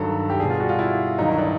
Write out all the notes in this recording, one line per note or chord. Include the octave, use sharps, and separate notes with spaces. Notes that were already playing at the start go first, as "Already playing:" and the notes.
Already playing: G2 D#3 F#3 A4
G4
B2 G3 G#4
F4
F#4
F4
E4
G2 D#3 F#3 D#4
E4
D4